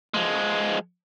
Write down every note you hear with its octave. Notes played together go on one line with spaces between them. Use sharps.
F3 G#3